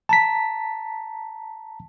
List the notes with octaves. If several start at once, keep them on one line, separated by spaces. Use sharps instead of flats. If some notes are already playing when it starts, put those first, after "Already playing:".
A5 A#5 B6